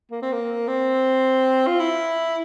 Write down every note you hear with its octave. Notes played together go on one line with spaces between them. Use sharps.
A#3
C4
A#3
C4
F4
E4